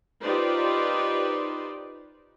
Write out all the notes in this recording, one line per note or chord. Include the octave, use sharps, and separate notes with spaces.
D#4 F4 G4 B4 C5 D5